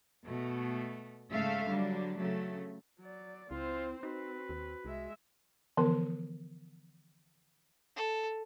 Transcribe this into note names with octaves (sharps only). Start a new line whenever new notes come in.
B2 A3
G#2 C#3 A3 A4 E5 F5
D3 F#3 G3 D4
C#3 F#3 A3
F#3 D5
C#2 C4 E4 F4 C5
C4 D#4 F#4 B4
D#2
C2 G#3 E5
D3 E3 F3 B3 A#4
A4